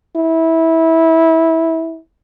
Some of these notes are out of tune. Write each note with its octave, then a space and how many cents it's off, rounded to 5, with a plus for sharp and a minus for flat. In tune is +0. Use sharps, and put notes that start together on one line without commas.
E4 -20